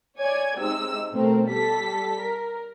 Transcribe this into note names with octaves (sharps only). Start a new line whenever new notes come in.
C#5 D5 G#5 G#6
C3 G#3 D#4 E6
B2 A3 C4 A#4
G3 A4 B6
A#4